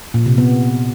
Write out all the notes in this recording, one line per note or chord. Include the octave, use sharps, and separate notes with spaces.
A#2
C3
B3